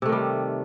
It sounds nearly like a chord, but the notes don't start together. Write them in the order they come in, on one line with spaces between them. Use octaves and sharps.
C3 A3 D#3 G3